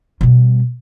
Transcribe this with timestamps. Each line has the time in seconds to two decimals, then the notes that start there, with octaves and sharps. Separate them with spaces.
0.21 B2 G3